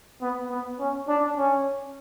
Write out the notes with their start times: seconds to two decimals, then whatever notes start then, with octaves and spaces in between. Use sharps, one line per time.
0.21 B3
0.49 B3
0.79 C#4
1.08 D4
1.37 C#4